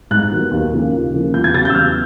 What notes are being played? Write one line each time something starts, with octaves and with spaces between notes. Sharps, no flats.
G#2 F#6
D#3 F#3 B3
D#2
C#3 F3 A#3
D#2
C#3 F3 A#3
E2 G6
G#6
C#3 F#3 A6
E6 G6
E2 F6